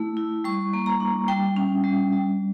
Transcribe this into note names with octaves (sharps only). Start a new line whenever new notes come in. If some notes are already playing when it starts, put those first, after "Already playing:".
Already playing: A3 E4
E4
G3 C#6
A#3
A#5
D4
G3 G5
C#4
G3
G3